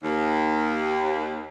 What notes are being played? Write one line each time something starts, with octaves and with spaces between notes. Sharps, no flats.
D#2